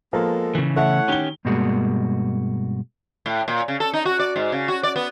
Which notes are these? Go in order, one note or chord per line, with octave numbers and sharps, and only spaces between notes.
F3 G#3 A#3 B3 A4
C#3 E3
A3 E4 C#5 F#5
D#3 C#4 G4 G7
G2 B2 G3 G#3 A#3 F#4
A2
A#2
C#3
A4
D#4
F#4
D5
G#2
C#3
F#4
D5
B3